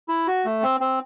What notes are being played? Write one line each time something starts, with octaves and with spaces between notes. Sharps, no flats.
E4
F#4
A3
C4
C4